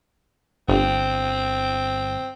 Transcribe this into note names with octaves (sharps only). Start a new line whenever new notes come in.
G1 C4